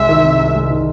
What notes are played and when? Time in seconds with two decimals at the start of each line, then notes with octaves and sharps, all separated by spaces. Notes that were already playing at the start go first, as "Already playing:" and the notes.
Already playing: C2 C3 G#3 E5
0.09 D#3
0.25 C3
0.40 C2
0.55 G#3
0.70 D#3